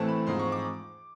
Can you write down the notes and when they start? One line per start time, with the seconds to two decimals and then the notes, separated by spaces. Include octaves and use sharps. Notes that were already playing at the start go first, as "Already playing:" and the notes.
Already playing: A2 E3 A3 C4 A5
0.08 B5
0.27 G#2 F3 G#3 C4 C6
0.39 C#6
0.52 D6